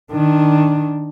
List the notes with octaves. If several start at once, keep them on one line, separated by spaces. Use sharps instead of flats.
D#3 D4